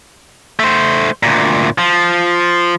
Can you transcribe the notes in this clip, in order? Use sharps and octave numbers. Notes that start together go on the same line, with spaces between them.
A3 C5
D2 A#2
F3